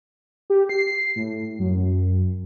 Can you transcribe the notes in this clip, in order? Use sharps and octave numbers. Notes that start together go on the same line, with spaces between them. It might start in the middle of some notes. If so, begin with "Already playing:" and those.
G4
C7
A2
F#2